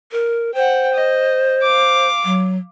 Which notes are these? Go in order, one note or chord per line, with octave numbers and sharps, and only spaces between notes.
A#4
C5 F#5 G5
D#5
F5 D6
F#3